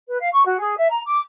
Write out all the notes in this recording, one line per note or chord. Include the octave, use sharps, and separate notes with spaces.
B4
F5
C#6
F#4
G#4
E5
A#5
D6